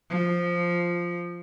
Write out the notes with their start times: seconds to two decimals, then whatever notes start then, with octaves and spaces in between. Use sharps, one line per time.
0.10 F3